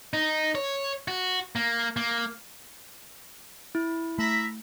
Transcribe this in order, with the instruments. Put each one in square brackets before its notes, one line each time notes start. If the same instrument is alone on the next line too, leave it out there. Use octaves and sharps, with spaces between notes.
[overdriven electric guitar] D#4
C#5
F#4
A#3
A#3
[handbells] E4
[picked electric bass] A3 [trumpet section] E5 A#5 B5